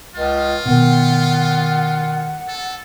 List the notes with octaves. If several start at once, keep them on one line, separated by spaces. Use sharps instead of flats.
C#2 F4
B2 D#3 F#5
A4